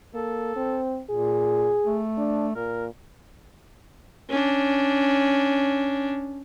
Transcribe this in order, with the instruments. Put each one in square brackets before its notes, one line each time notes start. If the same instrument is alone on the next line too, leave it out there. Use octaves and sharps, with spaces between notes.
[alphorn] A#3 [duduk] A4
[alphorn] C4
[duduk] A#2 [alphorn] G#4
[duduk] A3
[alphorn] D4
[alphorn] A#2 [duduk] A#4
[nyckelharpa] C#4 D4